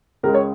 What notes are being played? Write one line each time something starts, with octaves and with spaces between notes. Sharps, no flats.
C#2 C#3 G#3 A#4
C#5